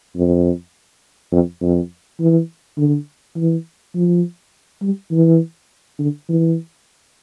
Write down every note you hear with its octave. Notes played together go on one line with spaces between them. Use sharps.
F2
F2
F2
E3
D3
E3
F3
G3
E3
D3
E3